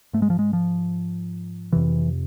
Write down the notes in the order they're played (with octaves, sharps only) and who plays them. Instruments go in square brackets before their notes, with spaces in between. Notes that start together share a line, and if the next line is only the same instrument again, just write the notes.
[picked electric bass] G#2 A3
G#3
F3
G#3
F3
F2 C3 E3